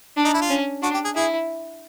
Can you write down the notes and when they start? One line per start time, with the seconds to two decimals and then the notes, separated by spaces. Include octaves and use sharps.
0.17 D4
0.25 D#4
0.34 E4
0.42 F4
0.50 C#4
0.83 D4 F#4
0.94 G4
1.04 G#4
1.15 E4 G#4